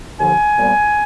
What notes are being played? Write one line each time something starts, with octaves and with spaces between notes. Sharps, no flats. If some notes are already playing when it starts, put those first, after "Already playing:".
D#2 D3 F3 G#5
C2 A#2 G3 B3